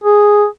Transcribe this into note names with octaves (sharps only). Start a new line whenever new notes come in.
G#4